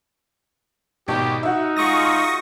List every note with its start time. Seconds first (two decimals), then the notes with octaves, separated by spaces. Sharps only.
1.08 G#1 B2 G4
1.43 D#4 F#4 E5
1.76 G#3 F4 C#6 D#6 A#6